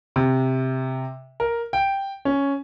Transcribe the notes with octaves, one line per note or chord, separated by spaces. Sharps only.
C3
A#4
G5
C#4